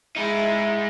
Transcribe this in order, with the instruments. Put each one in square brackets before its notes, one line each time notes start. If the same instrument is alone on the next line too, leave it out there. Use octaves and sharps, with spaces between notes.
[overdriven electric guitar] G#3 D#4 [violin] E4